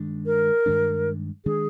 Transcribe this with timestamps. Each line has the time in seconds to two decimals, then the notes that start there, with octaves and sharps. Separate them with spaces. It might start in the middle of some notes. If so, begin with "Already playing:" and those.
Already playing: G2 D#3 G#3 D4
0.26 A#4
0.66 G2 D#3 G#3 D4
1.45 D#3 G#3 D4 G#4